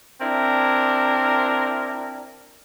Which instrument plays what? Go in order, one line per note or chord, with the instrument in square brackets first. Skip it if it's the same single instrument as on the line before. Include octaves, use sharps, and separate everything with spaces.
[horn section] C4 D4 E4 A#4